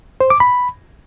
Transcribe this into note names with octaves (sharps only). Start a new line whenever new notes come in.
C5
D6
B5